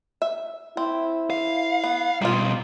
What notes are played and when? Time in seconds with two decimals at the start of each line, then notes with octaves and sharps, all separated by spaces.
0.22 E5
0.77 C4 E4
1.30 F5
1.84 B3
2.22 B2 G3 A#3 F4